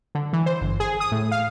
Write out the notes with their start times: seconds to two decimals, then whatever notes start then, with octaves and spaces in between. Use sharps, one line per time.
0.15 D3
0.33 E3
0.46 C5
0.61 G1
0.80 G#4
1.00 D#6
1.12 A2
1.32 F5